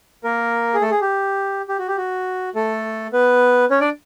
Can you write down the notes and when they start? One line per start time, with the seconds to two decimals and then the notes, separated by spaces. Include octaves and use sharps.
0.24 A#3 A#4
0.74 G#4
0.81 A3 A4
0.91 G#4
1.01 G4
1.68 G4
1.79 F#4
1.88 G4
1.97 F#4
2.55 A3 A4
3.13 B3 B4
3.70 C#4 C#5
3.81 D4 D5